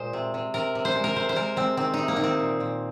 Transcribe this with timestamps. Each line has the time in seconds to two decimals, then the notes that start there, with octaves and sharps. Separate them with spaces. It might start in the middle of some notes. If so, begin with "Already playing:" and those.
Already playing: A#2 G#3 C5 D#5
0.13 C3
0.34 C3
0.54 C3 A#4
0.75 C3
0.85 C5
0.95 G#3
1.04 A#4
1.16 C3 C5
1.29 C5
1.36 G#3 A#4
1.56 G#3 C4
1.77 D#3 C4
1.94 D#4
1.99 C3
2.08 A#3
2.16 D#3 D#4
2.24 C4
2.40 A#2
2.60 A#2